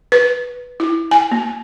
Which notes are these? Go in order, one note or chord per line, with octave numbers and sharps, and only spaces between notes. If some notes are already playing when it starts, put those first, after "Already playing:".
B4
E4
G#5
A#3